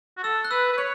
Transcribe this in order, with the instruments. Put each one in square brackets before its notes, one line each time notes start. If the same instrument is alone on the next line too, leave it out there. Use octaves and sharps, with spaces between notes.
[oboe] F#4
[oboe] A4 [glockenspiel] E6
[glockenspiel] F#6
[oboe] B4 [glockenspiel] E6
[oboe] B4
[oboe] C#5 [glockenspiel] F#6